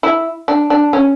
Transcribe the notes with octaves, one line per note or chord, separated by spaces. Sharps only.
E4
D4
D4
C#4